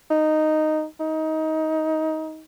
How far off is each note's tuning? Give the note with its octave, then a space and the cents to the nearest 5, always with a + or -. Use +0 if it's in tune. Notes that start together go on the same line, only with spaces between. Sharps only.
D#4 -5
D#4 +20